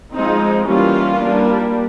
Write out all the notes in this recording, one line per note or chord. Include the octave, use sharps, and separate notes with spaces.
F3 G#3 C4 D#4
E3 G3 A#3 C#4 F4
G3 A#3 D4